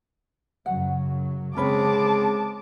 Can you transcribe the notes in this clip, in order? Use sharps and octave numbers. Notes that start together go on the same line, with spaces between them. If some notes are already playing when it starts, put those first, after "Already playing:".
F#2 C#3 F#3 F#5
C#3 G#3 C4 C#4 B4 C#5 A5 D6